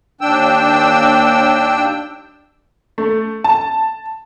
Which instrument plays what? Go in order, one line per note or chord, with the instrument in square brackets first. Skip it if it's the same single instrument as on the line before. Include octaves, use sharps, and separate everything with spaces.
[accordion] D#2 D4 G5 E6
[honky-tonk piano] A3
A5